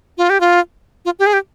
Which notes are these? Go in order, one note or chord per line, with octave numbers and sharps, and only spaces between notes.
F4
G4
F4
F4
G4
G#4
G4